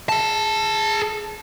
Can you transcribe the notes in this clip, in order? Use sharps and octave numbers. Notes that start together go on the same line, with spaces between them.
G#4 A5